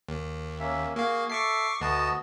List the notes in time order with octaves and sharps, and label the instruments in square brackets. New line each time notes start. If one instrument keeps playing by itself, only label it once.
[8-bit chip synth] D#2
[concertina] A#3 C#4 E5
[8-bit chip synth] A#3 F5 [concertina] F#4 G#4
[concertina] A4 E5 [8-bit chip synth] C#6 D6 C7
[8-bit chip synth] D2 A5 [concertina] B3 F#4 D#5